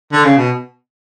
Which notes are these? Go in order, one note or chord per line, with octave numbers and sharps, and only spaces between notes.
D3
C#3
B2